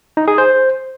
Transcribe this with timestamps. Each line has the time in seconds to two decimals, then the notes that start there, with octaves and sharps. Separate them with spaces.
0.17 D#4
0.28 G#4
0.38 C5